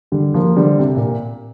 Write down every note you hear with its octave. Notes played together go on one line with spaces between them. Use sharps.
D3 G3
F3 A#3
D3 G3
C3
A#2